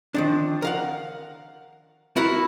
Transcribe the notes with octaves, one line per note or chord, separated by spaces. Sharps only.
D#3 F3 D4
A#4 F5 F#5
E4 F#4 A#4 B4